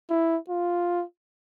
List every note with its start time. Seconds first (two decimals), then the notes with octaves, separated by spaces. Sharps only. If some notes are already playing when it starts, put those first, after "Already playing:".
0.10 E4
0.49 F4